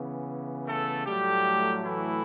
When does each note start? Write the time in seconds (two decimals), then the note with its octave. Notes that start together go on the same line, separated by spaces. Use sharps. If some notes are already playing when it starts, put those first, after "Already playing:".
Already playing: C#3 E3 B3
0.67 A3 A4
1.05 A2 F#3 G3 A3 G4
1.84 E3 E4